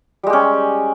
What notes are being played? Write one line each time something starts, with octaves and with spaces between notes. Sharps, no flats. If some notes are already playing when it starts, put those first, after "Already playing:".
G3 G#3 C#4 G4